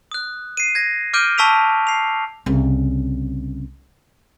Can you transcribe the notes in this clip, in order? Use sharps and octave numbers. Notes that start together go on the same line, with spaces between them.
D#6 F#6
C7 D#7
G#6 A#6
D6 F6 G6 D7 D#7 G7
A5 C#6 E6 B6 D7 F7
C7 F7
C2 C#3